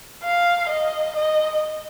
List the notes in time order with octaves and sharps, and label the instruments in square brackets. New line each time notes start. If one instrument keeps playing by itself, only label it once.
[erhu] F5
D#5
D#5